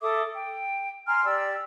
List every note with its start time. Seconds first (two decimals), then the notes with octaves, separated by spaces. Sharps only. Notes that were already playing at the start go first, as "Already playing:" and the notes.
0.01 A4 E5 D6 D#6
0.34 G5
1.07 G#5 A#5 C6 F6
1.24 G4 D5 E6